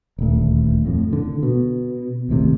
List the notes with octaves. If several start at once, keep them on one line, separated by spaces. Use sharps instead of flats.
D#1 D2
F2 A2
D3
B2
G#1 D#2 A2 C3